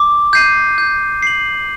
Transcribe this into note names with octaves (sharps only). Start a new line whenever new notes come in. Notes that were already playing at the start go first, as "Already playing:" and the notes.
Already playing: D6
G6 C7 D#7
G6
C7 F#7